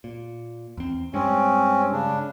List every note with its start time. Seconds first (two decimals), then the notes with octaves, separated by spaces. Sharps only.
0.04 A#2
0.77 E2 C4
1.14 G2 G#3 C4 C#4
1.92 C#3 D4